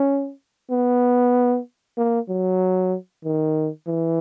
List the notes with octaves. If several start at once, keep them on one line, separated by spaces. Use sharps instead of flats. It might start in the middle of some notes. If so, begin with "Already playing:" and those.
Already playing: C#4
B3
A#3
F#3
D#3
E3